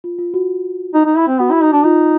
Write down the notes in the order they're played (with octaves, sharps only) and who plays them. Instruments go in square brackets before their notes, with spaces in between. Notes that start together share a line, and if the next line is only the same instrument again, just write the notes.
[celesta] F4
F4
F#4
[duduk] D#4
D#4
E4
C4
[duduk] B3 [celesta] F#4
[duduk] E4
D#4
D4
[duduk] D#4 [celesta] F4